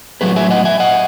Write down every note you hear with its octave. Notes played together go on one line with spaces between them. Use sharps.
A2 F#3 A3 G#4 B4
E5 G#5
D#5 F#5
E5 G#5
D#5 F#5